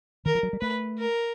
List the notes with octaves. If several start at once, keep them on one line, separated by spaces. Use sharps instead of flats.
D#3 A#4
F3
F#3
G3
A3 B4
A#4